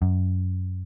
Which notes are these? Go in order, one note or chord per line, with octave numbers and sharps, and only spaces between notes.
F#2